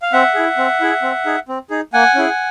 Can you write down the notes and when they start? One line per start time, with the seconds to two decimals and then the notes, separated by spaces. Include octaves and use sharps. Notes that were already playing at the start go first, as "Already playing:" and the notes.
0.02 F5
0.13 C4 E5 F#5
0.35 E4 G#4
0.57 C4
0.81 E4 G#4
1.02 C4
1.26 D#4 G#4
1.48 C4
1.70 D#4 G#4
1.94 A#3 F#5 G#5
2.15 C#4 E4 G#4